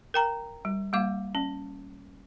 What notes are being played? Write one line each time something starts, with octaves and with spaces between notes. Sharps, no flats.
A#4 G5 A#5
G3
G3 A#3 F5 D6
C#4